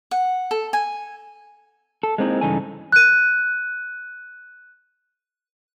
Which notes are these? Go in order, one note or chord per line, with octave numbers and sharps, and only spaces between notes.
F#5
A4
G#5
A4
G#3 A#3 C4 D#4 E4
G2 C#3 E3 D#4 A4 G#5
F#6 D#7